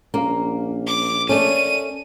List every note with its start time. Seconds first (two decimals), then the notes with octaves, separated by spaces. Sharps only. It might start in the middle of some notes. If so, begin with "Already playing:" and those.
0.14 A#1 A#3 C#4 A#4 F5
0.87 D6
1.29 A3 C#4 A4 A#4 D5 D#7